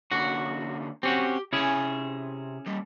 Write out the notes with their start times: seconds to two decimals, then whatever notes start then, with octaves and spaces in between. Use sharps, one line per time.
0.11 D3 A#3 C#4 F#4
1.03 C4 C#4 F#4 G4
1.53 C3 C#4 E4 G#4 G#5
2.66 G3 A#3